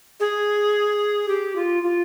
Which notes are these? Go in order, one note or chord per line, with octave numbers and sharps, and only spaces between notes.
G#4
G4
F4
F4